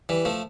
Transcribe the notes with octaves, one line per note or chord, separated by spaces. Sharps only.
E3 G3
F3 A3